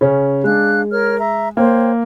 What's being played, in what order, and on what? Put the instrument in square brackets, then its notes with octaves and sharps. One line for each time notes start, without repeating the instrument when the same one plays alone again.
[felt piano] C#3 C#4
[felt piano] G#3 [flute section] D4 F5 F#6
[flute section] A#4 C#5 F6
E5 A#5
[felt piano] A#3 [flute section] C5 C#5 G5